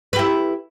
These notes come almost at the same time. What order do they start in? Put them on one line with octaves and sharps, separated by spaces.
B4 G4 E4